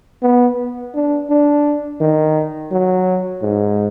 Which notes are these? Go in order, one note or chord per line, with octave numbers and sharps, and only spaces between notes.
B3
D4
D4
D#3
F#3
G#2